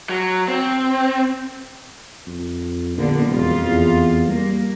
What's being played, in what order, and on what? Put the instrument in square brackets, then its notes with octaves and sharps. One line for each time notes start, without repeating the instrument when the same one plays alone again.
[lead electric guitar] F#3
C4
[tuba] F2
[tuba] A#1 [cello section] D3 A#3 B3
[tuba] E1 [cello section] F2 F4
[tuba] E2
[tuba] G3 [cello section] A#3